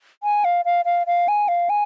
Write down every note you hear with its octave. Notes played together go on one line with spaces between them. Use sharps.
G#5
F5
F5
F5
F5
G#5
F5
G#5